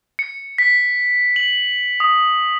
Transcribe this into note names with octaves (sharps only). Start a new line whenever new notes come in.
C#7
B6
F#7
D#6